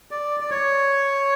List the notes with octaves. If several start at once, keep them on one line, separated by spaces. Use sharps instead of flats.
D5
D5
C#5